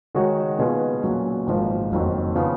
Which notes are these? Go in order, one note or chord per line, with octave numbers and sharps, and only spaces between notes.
D#3 G#3 D#4 F#4 C#5
B2 A#3 F4 G#4 B4
A#2 F#3 C#4
G#1 G#2 F3 A#3
F#1 F2 D#3 F#3
C#3 F3 B3